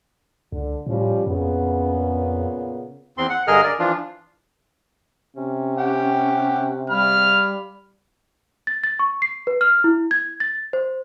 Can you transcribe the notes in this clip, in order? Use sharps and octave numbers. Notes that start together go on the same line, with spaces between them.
C#2 D3
A2 F3 G3 C#4
F2 A#2 C#3 B3
E2 C4 C6
F#5
G2 D3 G#4 A#4 D#5 F6
A#4 D5
E3 F3 D4 F4
C3 C#4
G4 F#5 G5
G3 F5 B5 F6
A6
A6
C#6
C7
B4
F6
E4
G#6
A6
C5